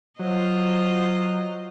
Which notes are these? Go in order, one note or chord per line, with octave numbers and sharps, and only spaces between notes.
F#3 F4 C5 D#5